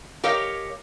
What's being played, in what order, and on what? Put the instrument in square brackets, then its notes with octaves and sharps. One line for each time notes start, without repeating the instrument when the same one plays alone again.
[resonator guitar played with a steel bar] G4 A#4 C#5 D#5 F5